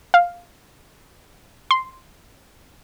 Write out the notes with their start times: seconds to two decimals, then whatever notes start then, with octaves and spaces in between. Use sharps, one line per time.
0.14 F5
1.71 C6